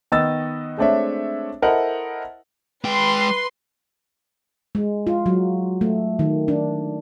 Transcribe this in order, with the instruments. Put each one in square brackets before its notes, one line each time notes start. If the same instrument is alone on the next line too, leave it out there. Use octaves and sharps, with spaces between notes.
[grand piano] D#3 B3 D#5 E6 A6
G#3 A3 C4 D4 C#5 E5
E4 A4 A#4 C5 D#5 F#5
[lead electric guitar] G#3 G5 [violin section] B4 C6
[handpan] G#3
F4
F#3
A3
D#3
D4